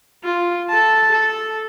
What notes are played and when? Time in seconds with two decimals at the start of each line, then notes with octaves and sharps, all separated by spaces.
0.24 F4
0.70 A4 A5
1.12 A4